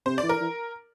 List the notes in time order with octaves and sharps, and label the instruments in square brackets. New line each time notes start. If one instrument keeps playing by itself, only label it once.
[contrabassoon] C3 [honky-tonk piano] C5
[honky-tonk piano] D5
[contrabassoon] E3
[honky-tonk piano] A#4
[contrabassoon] E3